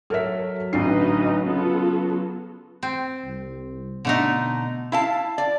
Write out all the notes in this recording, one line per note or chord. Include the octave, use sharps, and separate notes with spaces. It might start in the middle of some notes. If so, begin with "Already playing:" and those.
F#3 A4 A#4 E5 F6 B6
A1 D2 D3 D#4 B4 D#5 C7
C#3 B3 F4 A4
C4
C2
B2 D3 A3 D#4
E4 F5 A5
D5